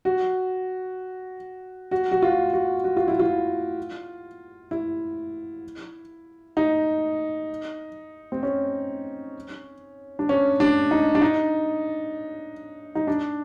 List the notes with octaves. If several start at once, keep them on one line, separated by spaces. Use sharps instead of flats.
F#4
F#4
F#4
F4
F#4
F#4
F4
E4
F4
E4
D#4
C4
C#4
D4
C#4
D4
D#4
D4
D#4
D#4
D4